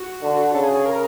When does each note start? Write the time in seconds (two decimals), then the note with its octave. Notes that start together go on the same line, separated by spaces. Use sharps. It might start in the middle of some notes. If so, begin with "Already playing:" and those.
Already playing: F#4
0.22 D3
0.54 C#3 A4
0.64 G#4
0.75 G#4
0.86 A#4